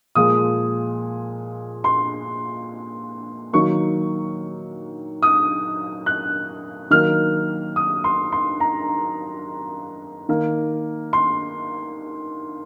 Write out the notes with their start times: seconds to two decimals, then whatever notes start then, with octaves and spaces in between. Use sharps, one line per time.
0.15 A#2 F3 G#3 D#6
1.84 C6
3.53 D#3 F#3 A#3 C#6
5.23 D#6
6.06 F#6
6.91 D#3 F#3 A#3 F6
7.76 D#6
8.04 C6
8.32 C6
8.60 A#5
10.29 D#3 A#3
11.13 C6